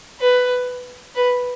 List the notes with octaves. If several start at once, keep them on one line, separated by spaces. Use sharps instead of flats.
B4
B4